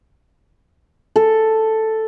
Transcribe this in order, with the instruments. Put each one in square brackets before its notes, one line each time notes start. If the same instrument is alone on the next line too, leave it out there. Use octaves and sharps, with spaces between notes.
[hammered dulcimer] A4